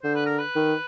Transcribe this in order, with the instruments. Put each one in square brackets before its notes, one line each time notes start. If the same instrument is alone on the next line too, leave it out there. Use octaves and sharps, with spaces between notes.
[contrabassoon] D3 [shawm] C5
[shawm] B4
A#4
B4
[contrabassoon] D#3